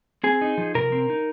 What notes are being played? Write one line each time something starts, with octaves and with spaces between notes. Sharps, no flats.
C4 G#4
D#4
F3
C3 A#4
C4
D#4